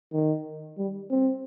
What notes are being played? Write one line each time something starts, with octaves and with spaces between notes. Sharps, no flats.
D#3
G3
C4